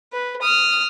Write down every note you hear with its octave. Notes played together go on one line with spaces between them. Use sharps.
B4
D#6 F6